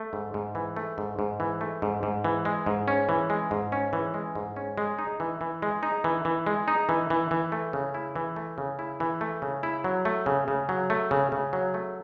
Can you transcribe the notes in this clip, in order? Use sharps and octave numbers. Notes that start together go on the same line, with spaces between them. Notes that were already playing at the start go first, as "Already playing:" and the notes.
Already playing: A3
G#2
G#2
E3
A3
G#2
G#2
E3
A3
G#2
G#2
E3
G#3
G#2
C#4
E3
G#3
G#2
C#4
E3
G#3
G#2
C#4
G#3
D#4
E3
E3
G#3
D#4
E3
E3
G#3
D#4
E3
E3
E3
A3
C#3
E4
E3
A3
C#3
E4
E3
A3
C#3
E4
F#3
A3
C#3
C#3
F#3
A3
C#3
C#3
F#3
A3